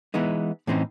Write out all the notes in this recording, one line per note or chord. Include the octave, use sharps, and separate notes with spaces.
E3 G#3 B3 D#4
A2 E3 C4 C#4 D#4